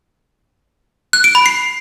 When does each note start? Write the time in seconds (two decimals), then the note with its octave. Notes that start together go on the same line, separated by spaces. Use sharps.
1.13 F#6
1.24 D7
1.35 B5
1.46 C7